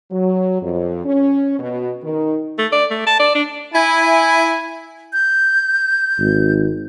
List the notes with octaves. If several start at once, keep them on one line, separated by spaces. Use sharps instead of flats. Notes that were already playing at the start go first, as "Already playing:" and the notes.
F#3
F2
C#4
B2
D#3
A3
D5
A3
A5
D5
D4
E4 G#5
G6
G#1